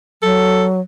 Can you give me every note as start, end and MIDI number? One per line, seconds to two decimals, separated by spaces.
0.23 0.80 54
0.23 0.66 69